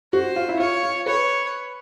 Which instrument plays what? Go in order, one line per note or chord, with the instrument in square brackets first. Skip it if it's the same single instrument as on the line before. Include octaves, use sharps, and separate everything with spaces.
[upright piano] F#4 [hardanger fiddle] C5
[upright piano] F4
E4
[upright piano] F4 [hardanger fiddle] C#5
[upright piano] F4
[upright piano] B4 [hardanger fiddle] C#5